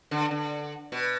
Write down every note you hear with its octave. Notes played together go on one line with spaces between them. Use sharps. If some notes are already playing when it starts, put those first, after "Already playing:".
D3
D3
B2